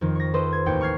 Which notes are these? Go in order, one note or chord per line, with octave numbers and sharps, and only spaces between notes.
F2 D#3
C#6 A#6
A4 B4 C5 D#5 G5
G#6
A1 D#2 G5 C#7
C#6 F6 G#6 C7